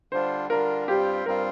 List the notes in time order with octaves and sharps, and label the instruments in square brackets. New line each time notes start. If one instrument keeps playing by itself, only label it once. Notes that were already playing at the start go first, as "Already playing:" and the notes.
[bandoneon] D3 G3 D4 F4 [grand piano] C5
[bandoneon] D3 G3 D4 F4 [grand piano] A#4
[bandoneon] G2 G3 C4 F4 [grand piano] G4
[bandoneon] G2 G3 C4 F4 [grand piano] A#4